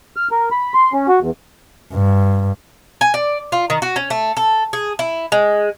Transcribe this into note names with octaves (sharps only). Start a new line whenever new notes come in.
F6
A#4
B5
C6
C#4
F#4
E2
G2
G#5
D5
F4
D#3
F#4
C#4
A3
A4
G#4
E4
G#3